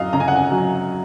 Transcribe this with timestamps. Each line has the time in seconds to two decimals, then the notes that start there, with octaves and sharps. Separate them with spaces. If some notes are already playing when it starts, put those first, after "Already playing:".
Already playing: F#2 D#5 F5 G#5
0.13 C#3 A#5
0.20 G#5
0.28 F#5
0.36 G#5
0.51 F#3